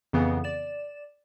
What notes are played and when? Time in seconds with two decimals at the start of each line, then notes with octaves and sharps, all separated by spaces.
0.13 F2 C#3 E3 B3
0.44 D5 E7